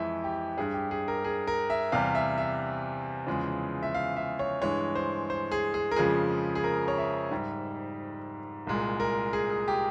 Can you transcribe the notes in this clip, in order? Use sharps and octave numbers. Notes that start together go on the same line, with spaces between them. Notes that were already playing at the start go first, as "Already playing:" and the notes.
Already playing: F2 E3 G#3 E5
G4
G2 G3 G#4
G4
G#4
A#4
G#4
A#4
E5
E2 C3 G3 F5
E5
E5
E2 C#3 F3 G#3
E5
F5
E5
C#5
G2 E3 G#3 C#5
C5
C5
G#4
G#4
A#4
F2 C#3 F3 G#3 G#4
G#4
A#4
C#5
E5
G#2 G3
C2 A#2 G#3
A#4
G#4
G#4
G4